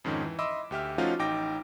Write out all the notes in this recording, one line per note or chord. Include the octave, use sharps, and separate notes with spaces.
F2 G#2 D#3 C#4
E3
D#5 E5 B5 C6 D6 E6
D2 G4 E5 F6
F3 A3 C#4 D#4 F4 F#4
A1 D#4 G5 D6 A#6